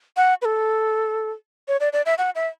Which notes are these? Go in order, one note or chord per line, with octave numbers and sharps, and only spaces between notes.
F#5
B4
A4
C#5
D5
D5
E5
F#5
E5